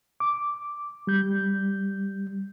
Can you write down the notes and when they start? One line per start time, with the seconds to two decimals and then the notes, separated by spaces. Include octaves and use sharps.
0.20 D6
1.07 G3 G6